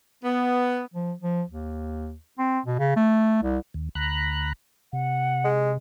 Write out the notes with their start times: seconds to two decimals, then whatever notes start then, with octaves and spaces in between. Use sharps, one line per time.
0.24 B3
0.94 F3
1.22 F3
1.48 D#2
2.39 C4
2.66 B2
2.79 C#3
2.96 A3
3.43 C2
3.74 D#2
3.95 D2 A#5 B5 F#6
4.93 C3 F#5
5.44 G#3